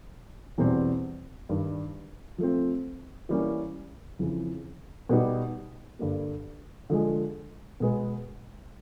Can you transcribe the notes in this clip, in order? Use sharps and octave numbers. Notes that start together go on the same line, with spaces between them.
E2 B2 G3 C4
G2 D#3 G3
F3 A3 C4
E3 G3 A#3 C#4
F2 C#3 E3
B2 G3 B3 D#4 G4
G2 D3 G3 A#3
D3 F3 G#3
B2 G#3 B3